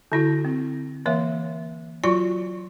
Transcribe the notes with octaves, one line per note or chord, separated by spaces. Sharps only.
D3 E4 F#4
C4
E3 A#3 C#5 E5
F#3 F4 F#4 D5 C#6